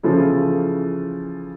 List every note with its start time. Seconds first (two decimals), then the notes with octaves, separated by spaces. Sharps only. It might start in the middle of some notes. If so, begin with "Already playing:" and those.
0.03 C#3 E3 F3 A4